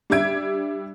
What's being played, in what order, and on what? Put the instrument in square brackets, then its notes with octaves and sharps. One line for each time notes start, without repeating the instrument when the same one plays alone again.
[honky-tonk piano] G3 D4 E5 G#6 D7